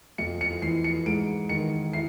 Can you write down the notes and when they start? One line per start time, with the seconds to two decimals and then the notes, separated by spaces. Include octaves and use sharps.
0.18 F2 C#7
0.41 C#7
0.62 E3 C7
0.84 C#7
1.06 G#2 D7
1.49 D#3 C#7
1.93 E4 C7